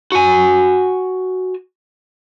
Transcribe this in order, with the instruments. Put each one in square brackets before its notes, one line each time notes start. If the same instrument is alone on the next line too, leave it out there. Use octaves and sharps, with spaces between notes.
[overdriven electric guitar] F#4 G#5